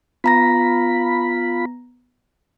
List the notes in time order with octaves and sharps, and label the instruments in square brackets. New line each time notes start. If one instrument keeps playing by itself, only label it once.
[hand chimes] B3 A#5 A#6 [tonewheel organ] F4 B5